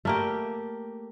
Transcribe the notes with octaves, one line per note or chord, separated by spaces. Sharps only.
A3 A#3 G4